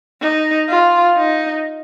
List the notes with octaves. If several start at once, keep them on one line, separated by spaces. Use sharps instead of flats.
D#4
F4
D#4